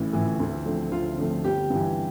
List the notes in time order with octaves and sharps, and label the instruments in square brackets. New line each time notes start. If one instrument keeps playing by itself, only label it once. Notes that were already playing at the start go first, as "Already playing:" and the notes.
Already playing: [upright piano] A1 A2 E3
A2 E3
D2
D3 F3 A3 C4
D2 F4
D3 F3 A3 C4
G1 G4
G2 E3